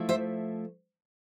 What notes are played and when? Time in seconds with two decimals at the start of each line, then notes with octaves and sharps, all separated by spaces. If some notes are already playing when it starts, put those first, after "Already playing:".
Already playing: F3 A3 E4
0.09 C5 E5